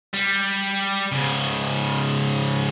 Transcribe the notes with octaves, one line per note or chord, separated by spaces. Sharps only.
G3
G#2 C#3